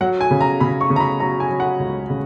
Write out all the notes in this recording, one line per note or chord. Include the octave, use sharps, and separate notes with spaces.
F#3 F#5
G#5
C#3
A#5
C#3 B5
C#6
C#3
A#5
B5
F#3 A#5
G#5
F#3
F#5
C#2
C#3